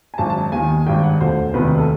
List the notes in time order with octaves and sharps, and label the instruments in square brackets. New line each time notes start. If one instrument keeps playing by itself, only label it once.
[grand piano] G#5
G#1 F#2 D#3 A5
A5
A5
D#2 D#3 G#5
G#1 G2 D#3 G5
F#5
E1 D2 D3 C5
E1 D2 C3 D#3 B4
A4